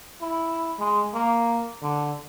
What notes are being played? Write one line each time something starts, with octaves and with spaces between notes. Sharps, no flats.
E4
G#3
A#3
D3